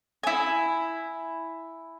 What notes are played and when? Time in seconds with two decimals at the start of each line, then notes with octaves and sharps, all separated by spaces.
0.23 E4 G#5